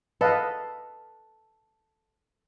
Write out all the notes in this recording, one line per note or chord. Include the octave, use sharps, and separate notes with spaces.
A4 B4 D#5 F5